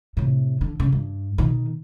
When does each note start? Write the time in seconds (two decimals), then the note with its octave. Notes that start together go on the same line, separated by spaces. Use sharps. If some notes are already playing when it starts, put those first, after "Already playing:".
0.17 A2 C3
0.61 D3
0.80 C#3
0.92 G2
1.38 B2 D#3